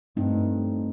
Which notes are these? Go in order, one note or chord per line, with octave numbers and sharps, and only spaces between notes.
G2 A3 C4 D#4